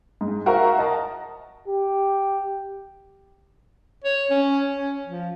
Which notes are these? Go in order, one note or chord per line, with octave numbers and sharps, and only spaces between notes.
G#2
F#4 A#4 C5 E5 F5
D#5 A5 A#5
G4
C#5
C#4
C#4
F3